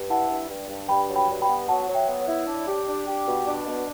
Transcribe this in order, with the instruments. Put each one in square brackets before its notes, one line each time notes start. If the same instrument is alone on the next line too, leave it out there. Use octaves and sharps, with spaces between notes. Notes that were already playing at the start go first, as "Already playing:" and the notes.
Already playing: [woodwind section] G2
[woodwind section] E4 [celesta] F#5 A5
[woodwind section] G2
G2
G2
[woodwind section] G2 [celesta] G5 B5
[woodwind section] F#3
[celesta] G5 B5
[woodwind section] G2
[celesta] G5 B5
[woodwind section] B3
[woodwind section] F#3 [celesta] F#5 A5
[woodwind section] F#3
[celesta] E5 G5
[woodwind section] B3
[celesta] C#5
[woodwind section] E4
D4
G4
D4
G4
B2
D4
B2